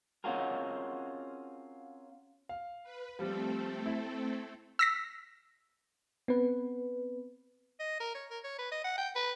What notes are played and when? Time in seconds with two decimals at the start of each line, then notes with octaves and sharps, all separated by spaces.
0.24 C4 C#4 F4 F#4 G#4 A#4
2.49 F5
2.83 B4
3.19 F3 G3 A3 C4 A4
3.86 E4
4.79 E6 A#6 B6
6.28 B3 C4 B4
7.80 D#5
8.00 A#4
8.14 C#5
8.30 A#4
8.44 C#5
8.58 B4
8.72 D#5
8.84 F#5
8.98 G5
9.15 B4